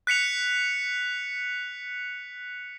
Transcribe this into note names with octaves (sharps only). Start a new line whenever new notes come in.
F#6 B6 C#7 F7